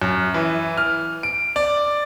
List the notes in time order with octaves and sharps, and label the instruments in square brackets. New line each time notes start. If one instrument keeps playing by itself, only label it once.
[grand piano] F#2
E3
F6
D7
D5